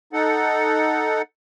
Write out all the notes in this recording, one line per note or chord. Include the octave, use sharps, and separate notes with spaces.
D#4 A4 F#5